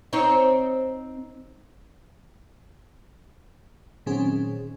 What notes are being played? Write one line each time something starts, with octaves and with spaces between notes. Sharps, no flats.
C4 D#4 C#5
A#2 D#3 F#3 C4 C#4 G#4